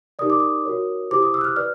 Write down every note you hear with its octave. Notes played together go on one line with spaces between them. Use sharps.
D#4 G4 A#4 D5 D#6
D6
D#6
F#4 A#4 C#5
E4 G4 C5 D6
D#6
E6
F#6
F6
B4 D5 F6